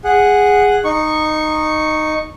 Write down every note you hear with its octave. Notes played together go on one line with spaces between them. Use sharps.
G#4 F#5
D#4 C#6